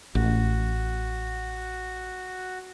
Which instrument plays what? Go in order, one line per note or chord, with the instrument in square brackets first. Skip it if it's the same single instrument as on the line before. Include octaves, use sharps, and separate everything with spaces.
[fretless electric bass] A1 [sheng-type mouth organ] F#4